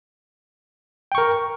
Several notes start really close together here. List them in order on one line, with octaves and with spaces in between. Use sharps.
G5 C#6 A#4